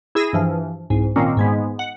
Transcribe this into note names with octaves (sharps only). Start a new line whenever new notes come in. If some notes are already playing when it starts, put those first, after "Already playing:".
E4 G#4 E6 A#6 D#7
G2 E3 F3
C2 G#2
A#2 D#3 A#3 C4 C#4
G#2 G#3 B3
F#5